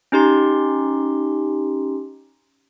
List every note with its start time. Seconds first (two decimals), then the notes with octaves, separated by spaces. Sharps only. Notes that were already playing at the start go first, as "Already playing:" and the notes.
0.12 C#4 D#4 G4 C6